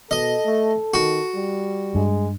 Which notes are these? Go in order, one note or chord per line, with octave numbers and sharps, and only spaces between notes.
B2 A4 D#5
A3
D#3 F#4
G3
G2 G#3